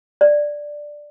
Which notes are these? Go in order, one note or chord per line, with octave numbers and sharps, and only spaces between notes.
D5